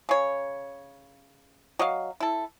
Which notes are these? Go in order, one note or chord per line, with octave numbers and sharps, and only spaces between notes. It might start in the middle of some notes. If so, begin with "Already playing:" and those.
C#3 C#5
F#3 D#5 F5
E4 A4